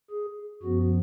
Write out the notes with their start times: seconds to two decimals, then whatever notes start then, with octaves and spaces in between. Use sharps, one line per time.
0.11 G#4
0.63 F#2 F3 B3 F#4